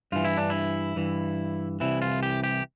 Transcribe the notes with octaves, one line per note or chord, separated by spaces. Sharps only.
G2 E3 F4
E4
D4
E4
G2 E3
C2 C3 E3 E4
F4
G4
G4